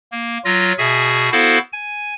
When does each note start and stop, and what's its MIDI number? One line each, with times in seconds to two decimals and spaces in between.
0.12 0.38 58
0.44 0.73 54
0.44 0.73 65
0.44 0.73 89
0.44 0.73 94
0.78 1.29 47
0.78 1.29 66
0.78 1.29 68
0.78 1.29 76
0.78 1.29 80
1.32 1.58 59
1.32 1.58 64
1.32 1.58 66
1.32 1.58 69
1.32 1.58 72
1.32 1.58 77
1.73 2.14 80